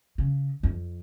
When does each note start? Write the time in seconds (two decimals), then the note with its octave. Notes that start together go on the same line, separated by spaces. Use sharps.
0.18 C#3
0.63 F2